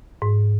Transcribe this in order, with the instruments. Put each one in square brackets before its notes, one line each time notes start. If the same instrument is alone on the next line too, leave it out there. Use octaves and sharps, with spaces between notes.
[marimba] G#2